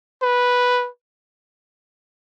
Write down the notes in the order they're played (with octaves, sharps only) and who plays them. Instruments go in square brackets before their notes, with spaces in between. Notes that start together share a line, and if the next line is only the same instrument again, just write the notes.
[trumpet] B4